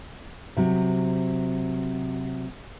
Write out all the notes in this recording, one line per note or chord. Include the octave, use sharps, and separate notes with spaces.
C3 F#3